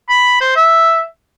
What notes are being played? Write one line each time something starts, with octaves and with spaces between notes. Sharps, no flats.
B5
C5
E5